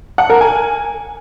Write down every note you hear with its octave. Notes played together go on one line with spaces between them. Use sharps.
F#5
A#4
G#5